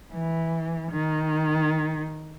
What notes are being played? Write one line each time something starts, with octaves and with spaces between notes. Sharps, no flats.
E3
D#3